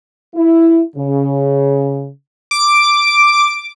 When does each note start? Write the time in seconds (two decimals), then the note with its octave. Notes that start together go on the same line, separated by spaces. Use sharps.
0.35 E4
0.96 C#3
2.51 D6 D7